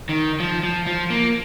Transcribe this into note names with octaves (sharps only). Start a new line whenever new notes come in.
D#3
F3
F3
F3
A#3